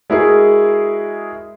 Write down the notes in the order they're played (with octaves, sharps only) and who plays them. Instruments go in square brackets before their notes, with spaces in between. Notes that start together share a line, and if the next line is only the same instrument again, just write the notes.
[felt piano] G#3 E4 F#4 G#4 A#4